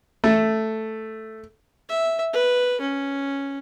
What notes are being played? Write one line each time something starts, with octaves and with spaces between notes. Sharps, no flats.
A3
E5
B4
C#4